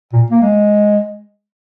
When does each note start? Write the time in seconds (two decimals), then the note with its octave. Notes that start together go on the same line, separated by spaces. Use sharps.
0.13 A#2
0.30 A#3
0.42 G#3